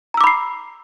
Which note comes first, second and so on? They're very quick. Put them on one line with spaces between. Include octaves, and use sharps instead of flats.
A#5 E6 D6 B5 C7